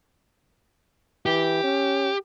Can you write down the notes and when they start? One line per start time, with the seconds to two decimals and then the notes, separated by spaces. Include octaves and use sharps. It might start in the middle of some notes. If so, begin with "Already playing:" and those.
1.26 E3 G4
1.64 C#4